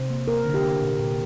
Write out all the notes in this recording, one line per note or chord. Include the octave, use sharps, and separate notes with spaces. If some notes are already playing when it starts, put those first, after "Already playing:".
Already playing: C3 C5
A#3
A#3 A#4
D3
G4
A#3
A#2
A#2